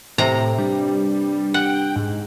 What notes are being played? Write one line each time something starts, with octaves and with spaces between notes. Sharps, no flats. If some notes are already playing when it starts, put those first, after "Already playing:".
A2 C3 A#5
G2 G3
F#5 G5
G#2